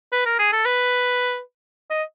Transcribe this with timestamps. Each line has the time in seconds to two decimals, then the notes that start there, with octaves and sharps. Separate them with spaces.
0.12 B4
0.26 A#4
0.39 G#4
0.53 A4
0.65 B4
1.90 D#5